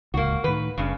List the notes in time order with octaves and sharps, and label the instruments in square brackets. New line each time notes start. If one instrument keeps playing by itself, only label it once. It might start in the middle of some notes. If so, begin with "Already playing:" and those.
[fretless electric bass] D1 C#2 [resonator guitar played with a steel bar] A#3 F#4
[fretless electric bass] A2 D#3 [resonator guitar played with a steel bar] B4
[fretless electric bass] F#1 [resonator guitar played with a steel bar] G2 C#3